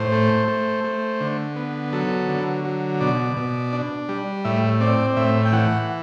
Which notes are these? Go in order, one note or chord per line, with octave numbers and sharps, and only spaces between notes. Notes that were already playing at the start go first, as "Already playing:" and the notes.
Already playing: A2 C5
A3
A3
A3
D3
B3
F#3 A4
D3
F#3
B2 D5
B2
D4
G3
A2 E5
C4 D5
A2 E5
G5
E3 F#5